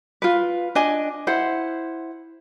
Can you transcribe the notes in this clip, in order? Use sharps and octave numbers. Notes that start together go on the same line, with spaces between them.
F4 B4
D4 D#5 G#5
E4 C5 F#5